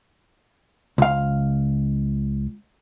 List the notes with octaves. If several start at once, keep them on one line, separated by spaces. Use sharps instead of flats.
C#2 F5